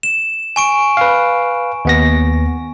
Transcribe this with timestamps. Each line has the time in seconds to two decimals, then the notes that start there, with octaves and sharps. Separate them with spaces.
0.03 E7
0.56 G#5 C#6 D7
0.97 B4 F5
1.85 D#2 B3 A#6